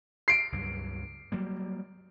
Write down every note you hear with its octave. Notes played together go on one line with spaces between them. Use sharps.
C7 D7
C#2 G2 F#3
F#3 G3 A#3